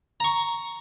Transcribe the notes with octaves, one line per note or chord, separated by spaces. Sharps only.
A#5 C#6